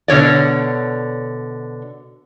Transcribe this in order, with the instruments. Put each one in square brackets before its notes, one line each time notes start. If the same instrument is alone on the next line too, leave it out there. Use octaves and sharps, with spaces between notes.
[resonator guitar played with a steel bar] B2 D3 C#5 D5